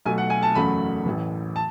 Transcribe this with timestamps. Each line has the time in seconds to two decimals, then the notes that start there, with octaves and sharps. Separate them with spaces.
0.06 B1 B2 A3 G#5
0.18 F#5
0.30 G#5
0.43 A5
0.55 F#1 E2 C#3 F#3 A3 B5
1.06 A1 A2 E3
1.56 A5